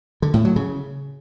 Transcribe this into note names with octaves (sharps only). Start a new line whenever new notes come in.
D3
A2
F#3
C#3